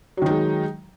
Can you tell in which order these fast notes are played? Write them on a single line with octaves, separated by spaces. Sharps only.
F#3 D#3 D#4 G#3